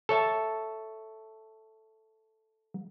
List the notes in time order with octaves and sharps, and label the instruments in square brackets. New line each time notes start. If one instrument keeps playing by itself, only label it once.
[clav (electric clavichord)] A4 C#5 E5 A5